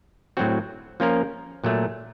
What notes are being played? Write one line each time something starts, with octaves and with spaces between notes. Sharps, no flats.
A2 F#3 C4 F#4
F3 A#3 C#4 F4 A#4
A#2 F#3 A3